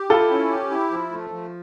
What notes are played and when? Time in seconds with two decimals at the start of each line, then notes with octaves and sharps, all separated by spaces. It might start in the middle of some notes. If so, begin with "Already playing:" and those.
Already playing: G4
0.10 E4 F4 A4
0.31 C#4
0.50 G4
0.71 E4
0.91 F3
1.11 A3
1.32 F3